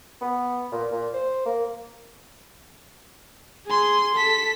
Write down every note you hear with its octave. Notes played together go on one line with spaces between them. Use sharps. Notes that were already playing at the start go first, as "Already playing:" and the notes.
B3
A#2
A#2
C5
A#3
G#4 C6
A4 B6